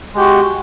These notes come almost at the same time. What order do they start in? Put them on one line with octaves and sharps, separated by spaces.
G#3 G4 F#4